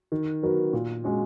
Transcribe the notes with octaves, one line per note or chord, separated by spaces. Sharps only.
D#3
F#3 B3 F#4 A#4
A#2
G#3 C#4 F#4